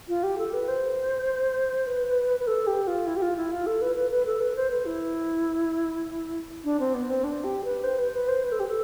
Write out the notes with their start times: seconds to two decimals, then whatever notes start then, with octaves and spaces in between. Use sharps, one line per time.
0.08 F4
0.23 G4
0.38 A4
0.53 B4
0.68 C5
1.87 B4
2.40 B4
2.47 A4
2.67 G4
2.87 F4
3.07 E4
3.16 G4
3.22 F4
3.37 E4
3.52 F4
3.67 A4
3.82 B4
3.96 B4
4.11 B4
4.26 A4
4.40 B4
4.56 C5
4.71 B4
4.85 E4
6.64 D4
6.80 C4
6.94 B3
7.10 C4
7.24 D4
7.44 G4
7.65 B4
7.84 C5
7.99 B4
8.13 B4
8.28 C5
8.44 B4
8.52 A4
8.60 G4
8.68 A4